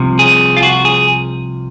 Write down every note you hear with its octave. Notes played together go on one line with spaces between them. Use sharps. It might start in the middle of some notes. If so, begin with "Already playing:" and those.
Already playing: C2 C3 F3
G#4
F4
F#4
G#4